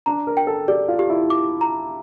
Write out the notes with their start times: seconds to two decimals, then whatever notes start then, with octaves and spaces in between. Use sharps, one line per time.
0.06 D4 A#5
0.27 A#4
0.37 G5
0.47 A4
0.68 G4 D5
0.88 F4
0.99 G4
1.10 E4
1.30 D6
1.61 A#5